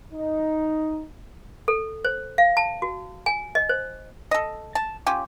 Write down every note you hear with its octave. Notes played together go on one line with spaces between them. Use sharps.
D#4
A4
C5
F5
A5
F#4
G#5
D#5
C5
A4 D#5
A5
C#4 F4 G4